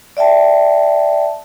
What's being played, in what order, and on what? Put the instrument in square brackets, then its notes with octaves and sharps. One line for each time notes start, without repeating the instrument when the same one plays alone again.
[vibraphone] D5 E5 G5 A5